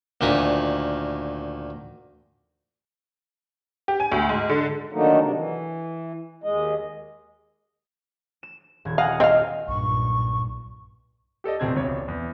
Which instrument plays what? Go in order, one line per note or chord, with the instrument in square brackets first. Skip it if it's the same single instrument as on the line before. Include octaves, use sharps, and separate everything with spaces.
[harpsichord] D2 A#2 D#3 B4 G#5 D#6
[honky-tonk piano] G4
G#5
D2
G#2
D3
[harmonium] D3 D#3 F#3 A3 A#3 D#4
C3 D4
E3
D#2 G#3 D#5
[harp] E7
D#1 G#6
[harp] D#5 F#5 G#5 [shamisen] F5
[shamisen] C4 F5 [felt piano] D#5 [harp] C7
[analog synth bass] B1 [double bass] G2 [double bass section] A#2 [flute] C#6
[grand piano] G4 A4 D5 D#5
F1 B1 C4 G#6
E1 C#2 C#5 D5
E2